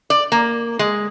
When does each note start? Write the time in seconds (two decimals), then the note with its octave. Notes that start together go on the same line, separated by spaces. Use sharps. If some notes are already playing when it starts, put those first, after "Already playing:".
0.10 D5
0.32 A#3
0.79 G#3